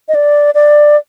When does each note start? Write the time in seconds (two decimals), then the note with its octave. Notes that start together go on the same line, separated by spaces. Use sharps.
0.08 D#5
0.15 D5
0.55 D5